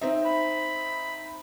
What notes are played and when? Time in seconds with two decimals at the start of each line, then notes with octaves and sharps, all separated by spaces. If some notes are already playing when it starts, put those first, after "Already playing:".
0.01 C4 D#4 E5
0.26 B5